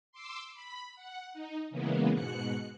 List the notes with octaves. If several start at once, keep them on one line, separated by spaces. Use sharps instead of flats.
C6 D6 E6
B5
F#5
D#4
C#3 E3 G#3 A#3 B3
G#2 B2 F#6 C#7